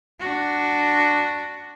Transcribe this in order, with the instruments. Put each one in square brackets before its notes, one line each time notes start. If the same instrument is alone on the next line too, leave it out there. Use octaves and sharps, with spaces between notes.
[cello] D4 F#4